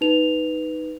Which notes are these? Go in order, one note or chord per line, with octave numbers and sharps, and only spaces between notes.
D#4 B4 F7